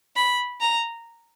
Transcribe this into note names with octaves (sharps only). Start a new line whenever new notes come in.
B5
A#5